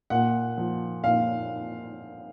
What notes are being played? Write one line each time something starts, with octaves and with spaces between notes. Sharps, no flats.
A#2 F#5
F3
A#2 F5